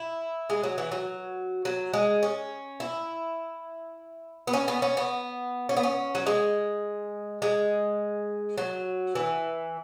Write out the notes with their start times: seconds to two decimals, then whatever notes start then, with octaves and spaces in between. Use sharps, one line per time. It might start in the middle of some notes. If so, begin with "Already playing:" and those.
Already playing: E4
0.50 G#3
0.63 F#3
0.78 E3
0.92 F#3
1.65 F#3
1.94 G#3
2.23 C#4
2.80 E4
4.47 B3
4.53 C#4
4.68 B3
4.82 C#4
4.97 B3
5.69 C#4
5.77 B3
5.83 C#4
6.15 F#3
6.27 G#3
7.42 G#3
8.58 F#3
9.15 E3